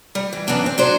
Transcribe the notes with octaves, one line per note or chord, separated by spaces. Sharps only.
G3
E3
F#2 E3 B3 D4 A5
C4
F#3 D4 C5